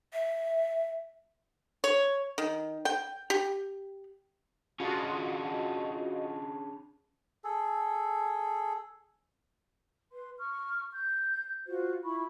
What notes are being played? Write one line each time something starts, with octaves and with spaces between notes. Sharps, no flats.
E5
C#5
D#3
G5
G4
C#4 D4 F4 F#4 G#4 D#5
G#4 A4
B4 C6
C#6 F6
G6
F4 F#4 C5
E4 F4 B5 C#6